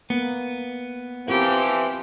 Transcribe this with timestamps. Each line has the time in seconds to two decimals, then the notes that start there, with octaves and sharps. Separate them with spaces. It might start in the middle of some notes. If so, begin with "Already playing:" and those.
0.10 A#3 B3
1.28 E3 F3 C4 F4 G4 A#4